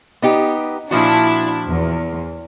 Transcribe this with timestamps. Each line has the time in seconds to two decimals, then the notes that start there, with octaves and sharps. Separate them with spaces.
0.22 B3 D#4 G4
0.91 A#2 F3 D4 E4 F#4
1.67 E2